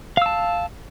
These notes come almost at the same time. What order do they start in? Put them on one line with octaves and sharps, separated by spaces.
F5 E6 A5